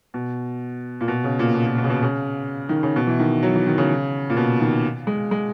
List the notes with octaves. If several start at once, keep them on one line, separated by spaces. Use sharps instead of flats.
B2
A#2
B2
C#3
A#2
B2
A#2
B2
C#3
B2
C#3
D#3
C#3
B2
E3
D#3
F#3
E3
D#3
C#3
A#2
B2
D#3
G#3
G#3